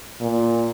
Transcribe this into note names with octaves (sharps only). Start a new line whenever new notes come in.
A#2